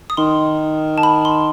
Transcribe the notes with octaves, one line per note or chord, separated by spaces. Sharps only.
D#6
D#3 C6
A5
B5
C6